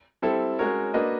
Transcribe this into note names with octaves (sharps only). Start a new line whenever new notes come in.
G3 C4 E4 A4
G#3 C#4 F#4 A#4 C#5
A#3 D4 F#4 B4 D#5